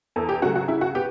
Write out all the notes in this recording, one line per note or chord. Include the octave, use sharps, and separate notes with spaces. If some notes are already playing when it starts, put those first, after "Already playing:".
E2 A4
G4
C#3 F#3 A3 F#4
F#4
C#3 E4
F#4
B3 G4